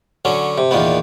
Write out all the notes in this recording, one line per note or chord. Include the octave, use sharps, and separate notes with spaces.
D3 F#3 C#4
C3
E2 A#2 D#3 B3